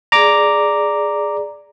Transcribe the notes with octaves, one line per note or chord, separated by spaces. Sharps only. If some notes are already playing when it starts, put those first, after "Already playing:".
G#4 D5 A#5 D6